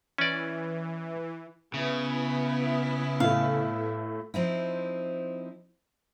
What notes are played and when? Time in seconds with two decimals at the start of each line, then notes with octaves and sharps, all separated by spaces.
0.18 E3 C#4 D5
1.74 C#3 B3 E4
3.20 A2 A3 F5
4.34 F3 C4 D#4 E4